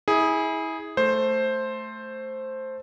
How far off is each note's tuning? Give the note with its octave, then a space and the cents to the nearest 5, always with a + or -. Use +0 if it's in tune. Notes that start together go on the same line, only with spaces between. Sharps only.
E4 -30 G#4 +0
A3 +0 C5 +5